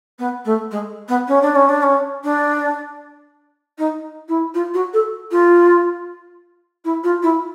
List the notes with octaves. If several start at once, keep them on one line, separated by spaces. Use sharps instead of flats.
B3
A3
G#3
B3
C#4
D4
C#4
D4
C#4
D4
D#4
E4
F4
F#4
A4
F4
E4
F4
E4